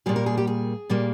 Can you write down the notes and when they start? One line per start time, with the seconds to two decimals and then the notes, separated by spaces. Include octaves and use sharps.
0.06 A#2 G3 A#3 G#4
0.16 A#4
0.26 G#4
0.37 G4
0.47 G#4
0.89 A#2 G3 A#3